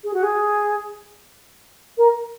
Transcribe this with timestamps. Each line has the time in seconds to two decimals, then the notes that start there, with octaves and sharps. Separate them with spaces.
0.03 G#4
0.13 F#4
0.23 G#4
1.97 A#4